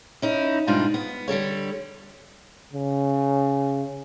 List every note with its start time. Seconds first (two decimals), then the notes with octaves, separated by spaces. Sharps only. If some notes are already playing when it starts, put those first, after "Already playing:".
0.22 C#4 D#4 E4
0.67 G#2 B2 G3 D4 D#4 F4
0.94 B3
1.28 D3 G3 A4 C#5
2.73 C#3